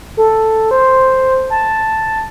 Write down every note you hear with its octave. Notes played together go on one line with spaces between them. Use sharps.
A4
C5
A5